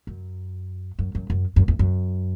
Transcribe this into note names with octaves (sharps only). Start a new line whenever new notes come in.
F#2
F#2
F#2
F#2
F#2
E2
F#2